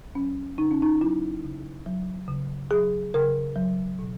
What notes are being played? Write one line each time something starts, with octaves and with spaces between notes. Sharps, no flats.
F#3 C#4
C#3 D#4
C#4
D#4
F#3 E4
C#3
F#3
C#3
F#3 G#4
C#3 A#4
F#3
B2